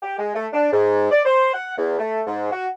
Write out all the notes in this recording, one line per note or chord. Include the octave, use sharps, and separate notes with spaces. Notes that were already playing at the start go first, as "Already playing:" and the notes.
G4
G#3
A3
D4
G#2
D5
C5
F#5
E2
A3
G#2
F#4